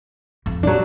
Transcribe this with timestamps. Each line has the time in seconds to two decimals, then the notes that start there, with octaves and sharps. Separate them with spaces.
0.46 F2
0.63 A#2 F#3 D4